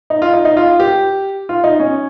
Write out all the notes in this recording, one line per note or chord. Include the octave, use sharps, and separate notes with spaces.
D#4
F4
D#4
D#4
F4
G4
F4
D#4
C#4